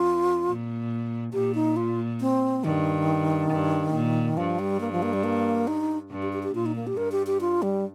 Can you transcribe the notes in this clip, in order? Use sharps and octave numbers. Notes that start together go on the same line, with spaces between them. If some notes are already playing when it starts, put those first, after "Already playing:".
Already playing: F2 F4
A#2
A#2 G4
D#4
F4
C4
G2 D#3
G2
A#2
G2 F3
G3
A#3
F3
A#3
G3
A#3
D#4
G2
G4
G4
G4
A#2 F4
D#4
A#3
G4
G2 A#4
G4
G4
F4
G3